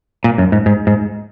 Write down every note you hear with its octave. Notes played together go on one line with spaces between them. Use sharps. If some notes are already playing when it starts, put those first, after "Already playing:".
A#2
F#2
G#2
G#2
G#2